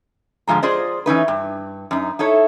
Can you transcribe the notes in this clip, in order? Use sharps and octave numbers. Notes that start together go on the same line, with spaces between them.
G#2 D3 F3 G#3 A#5
F4 G#4 C5 D5 D#5
E3 C#4 D#4 B4
G2
F#2 D#4
D#4 E4 A4 C#5